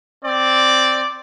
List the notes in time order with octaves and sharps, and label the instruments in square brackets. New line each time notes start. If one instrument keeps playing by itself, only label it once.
[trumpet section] C4 D5